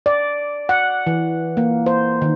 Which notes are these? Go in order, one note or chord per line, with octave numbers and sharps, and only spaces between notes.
D5
F#5
E3
A#3
C5
D#3